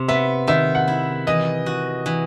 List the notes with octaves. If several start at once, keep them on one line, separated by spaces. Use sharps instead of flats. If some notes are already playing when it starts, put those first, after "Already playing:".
Already playing: C3
B3 E5
D#3 E5
F#5
E4
E3 D#5
F#4
E3